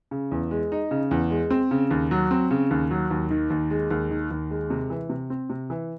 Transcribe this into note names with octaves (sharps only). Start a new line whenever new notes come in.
C#3
E2
G#3
D#4
C#3
E2
G#3
C4
C#3
D#2
F#3
C4
C#3
D#2
F#3
D#2
D#3
D#2
G#3
D#2
D#3
D#2
G#3
C3
E3
C3
C4
C3
E3